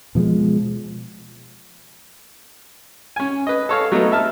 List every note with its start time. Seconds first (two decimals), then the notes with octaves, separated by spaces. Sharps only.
0.15 B2 F3 G3 G#3
3.16 C#4 G#5
3.47 B4 D#5
3.69 A4 C#5 F5
3.92 F#3 A3 B3 D#4
4.12 E5 A5 F6